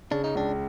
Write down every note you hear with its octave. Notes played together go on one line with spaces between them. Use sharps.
C#3 D4
D#4
C#2 D4